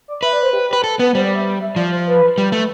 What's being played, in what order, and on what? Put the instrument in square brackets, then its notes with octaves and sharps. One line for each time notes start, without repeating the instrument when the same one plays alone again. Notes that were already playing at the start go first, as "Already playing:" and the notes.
[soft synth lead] D5
[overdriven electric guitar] B4 [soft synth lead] E5
[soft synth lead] D5
C5
G4
G4
[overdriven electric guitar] B4
A4
[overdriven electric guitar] B3 [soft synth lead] B4
[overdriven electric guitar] G3 [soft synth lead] C5
[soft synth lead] D5
E5
E5
[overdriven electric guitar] F3 [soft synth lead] D5
[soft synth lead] C5
B4
[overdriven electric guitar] G3
A3